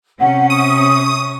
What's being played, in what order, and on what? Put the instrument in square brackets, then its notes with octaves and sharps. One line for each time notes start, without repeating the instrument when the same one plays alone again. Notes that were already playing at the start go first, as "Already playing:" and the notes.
[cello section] C3 C#4 [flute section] F#5
[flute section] C#6 [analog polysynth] D#6